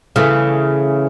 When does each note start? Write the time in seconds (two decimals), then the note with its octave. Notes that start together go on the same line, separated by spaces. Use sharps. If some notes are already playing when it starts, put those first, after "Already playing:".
0.16 C#3 E3 A3